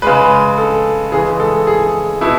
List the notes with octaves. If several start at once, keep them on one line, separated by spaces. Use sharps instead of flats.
C#3 G#3 B4
A4
C#3 E3 G#3 G#4
A4
G#4
B2 E4